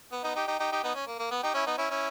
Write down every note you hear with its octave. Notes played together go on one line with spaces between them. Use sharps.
B3
B3 D#4
D#4 G4
D#4 G4
D#4 G4
D#4 G4
B3 D#4
C#4
A#3
A#3
B3
D#4 G4
C#4 E4
B3 D#4
C#4 E4
C#4 E4